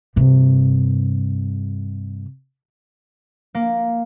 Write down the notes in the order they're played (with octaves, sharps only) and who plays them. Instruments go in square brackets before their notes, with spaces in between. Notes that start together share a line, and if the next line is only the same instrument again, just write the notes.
[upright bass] G2 C3
[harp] A#3